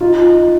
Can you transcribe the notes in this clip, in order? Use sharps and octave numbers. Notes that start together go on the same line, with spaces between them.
D#4 F4